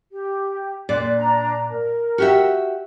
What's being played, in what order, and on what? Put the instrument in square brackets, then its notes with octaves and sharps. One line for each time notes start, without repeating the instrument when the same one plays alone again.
[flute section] G4
[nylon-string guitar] A#2 D5 [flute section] C6 F#6
[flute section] D4 A#5
A#4
[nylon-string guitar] F#4 G4 E5